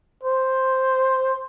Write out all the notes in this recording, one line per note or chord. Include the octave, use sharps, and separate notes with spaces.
C5